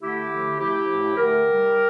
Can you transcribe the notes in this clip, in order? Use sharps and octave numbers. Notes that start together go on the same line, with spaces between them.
D3 A3 E4 G4
D3 F3 A3
C3 F3 A3 E4 G4
A2 F3 A3
D3 A3 G4 A#4
C3 G3